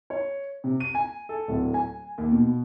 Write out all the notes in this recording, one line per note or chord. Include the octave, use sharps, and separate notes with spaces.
C#5
C3
D#7
G#5
A4
D1
G#5
D#2
B2